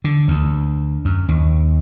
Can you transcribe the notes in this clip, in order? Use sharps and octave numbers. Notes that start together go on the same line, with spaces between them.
D3
D2
F#2
D#2